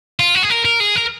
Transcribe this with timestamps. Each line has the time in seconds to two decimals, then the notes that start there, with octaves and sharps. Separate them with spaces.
0.19 F4
0.35 F#4
0.43 G#4
0.50 A#4
0.65 A#4
0.80 G#4
0.96 A#4